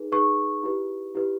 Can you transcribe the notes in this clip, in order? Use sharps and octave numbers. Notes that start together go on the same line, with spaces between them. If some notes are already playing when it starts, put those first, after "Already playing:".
Already playing: D#4 G#4 B4
D#4 G#4 B4 C#6
E4 G4 B4
E4 G4 B4